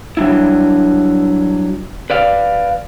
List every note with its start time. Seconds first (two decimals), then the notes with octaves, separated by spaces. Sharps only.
0.17 F#3 G3 D4 E4
2.10 B4 D5 F5